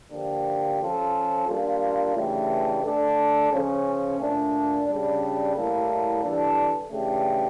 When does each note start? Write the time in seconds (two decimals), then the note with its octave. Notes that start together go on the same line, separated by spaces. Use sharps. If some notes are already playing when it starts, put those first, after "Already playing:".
0.11 D3 F3 A#3 D4 G4
0.80 F3 C#4 F4 A4
1.47 G3 A#3 D4 F4
2.15 C#3 E3 A3 D4 G4
2.84 A3 D4 A4
3.51 C#3 F3 C#4
4.19 A#2 A3 D4
4.87 C#3 G3 D4
5.55 A2 G3 A#3 E4 A4
6.23 E3 G3 D4 A4
6.91 C#3 E3 A3 D4 G4